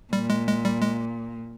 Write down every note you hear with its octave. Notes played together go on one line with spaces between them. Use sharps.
A#2 G3
G#3
G#3
G3
G#3